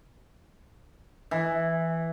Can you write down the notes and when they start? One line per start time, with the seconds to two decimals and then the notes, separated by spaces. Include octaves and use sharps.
1.31 E3